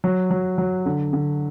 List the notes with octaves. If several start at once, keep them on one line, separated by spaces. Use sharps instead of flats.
F#3
F#3
F#3
D3
D3